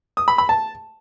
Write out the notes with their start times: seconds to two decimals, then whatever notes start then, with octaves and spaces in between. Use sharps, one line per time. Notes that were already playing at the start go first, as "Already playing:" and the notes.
0.17 D#6
0.28 B5
0.38 B5
0.49 A5